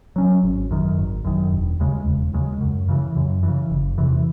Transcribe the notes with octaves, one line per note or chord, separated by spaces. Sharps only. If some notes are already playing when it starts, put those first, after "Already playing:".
F#3 C#4
G#1
F#2 D#3
G#1
F#2 D#3
E1
D#2 C#3 G#3
E1
D#2 C#3 G#3
F#2
C#3 E3
F#2
C#3 E3
F#1
E2 C3 E3